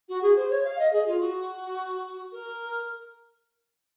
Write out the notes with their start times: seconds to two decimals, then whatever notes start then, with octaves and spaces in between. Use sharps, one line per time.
0.09 F#4
0.22 G#4
0.36 C5
0.50 C#5
0.64 F5
0.79 D#5
0.92 G#4
1.06 F4
1.20 F#4
2.32 A#4